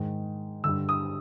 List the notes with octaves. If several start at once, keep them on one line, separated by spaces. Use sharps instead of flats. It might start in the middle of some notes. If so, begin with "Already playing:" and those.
Already playing: G#2 D#3
G2 D3 E6
D#6